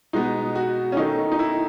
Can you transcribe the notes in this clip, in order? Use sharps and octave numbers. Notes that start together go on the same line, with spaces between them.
B2 G#3 B3 D#4
F#4
C#4
D#3 A3 D#4
D#4
E4